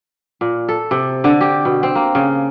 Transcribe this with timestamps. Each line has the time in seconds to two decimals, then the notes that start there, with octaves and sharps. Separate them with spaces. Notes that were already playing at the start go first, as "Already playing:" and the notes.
0.41 A#2
0.69 A4
0.91 C3
1.24 D3
1.41 G4
1.65 B2
1.83 C4
1.95 A#3
2.15 C#3